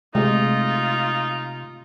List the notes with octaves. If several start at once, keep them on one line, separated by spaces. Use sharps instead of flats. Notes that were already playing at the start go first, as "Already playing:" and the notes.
C3 G#3 A3 D#4 F4